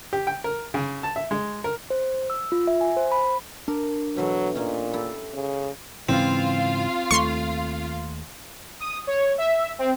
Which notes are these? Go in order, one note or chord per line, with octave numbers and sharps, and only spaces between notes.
G4
G5
A#4
C#3
A5
E5
G#3
A#4
C5
E6
F4
E5
G#5
C5
B5
D4 A#4
B2 E3 F#3 A3
A#2 C#4 D#4
E4 G4 A4
C#3
G#2 C#3 E3 C4 F4 F5
D#2 A3 C6 C#6
D#6
C#5
E5
C4